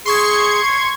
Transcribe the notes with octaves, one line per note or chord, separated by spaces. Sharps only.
G#4 C6 C#6 G#6